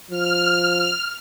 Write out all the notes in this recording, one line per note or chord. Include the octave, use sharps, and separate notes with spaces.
F3 F6